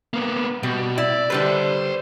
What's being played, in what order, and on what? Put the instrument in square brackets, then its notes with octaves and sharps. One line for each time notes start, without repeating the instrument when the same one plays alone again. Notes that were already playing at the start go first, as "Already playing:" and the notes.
[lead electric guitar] A#3 B3
[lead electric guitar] B2 [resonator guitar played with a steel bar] G3
[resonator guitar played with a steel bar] E4 [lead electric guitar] D5
[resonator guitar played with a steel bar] D3 G3 B4 [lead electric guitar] C5 B5